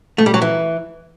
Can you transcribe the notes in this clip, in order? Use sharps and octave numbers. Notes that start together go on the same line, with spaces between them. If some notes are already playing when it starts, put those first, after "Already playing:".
A3
G3
F#3
E3